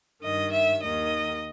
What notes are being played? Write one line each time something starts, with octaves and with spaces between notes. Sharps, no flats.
G2 D#3 D#5
E5
D#2 D#3 D#5